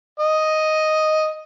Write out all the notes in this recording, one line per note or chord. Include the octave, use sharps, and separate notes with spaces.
D#5